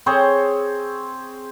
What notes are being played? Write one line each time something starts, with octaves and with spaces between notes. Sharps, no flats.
C4 G#4 C5 C#5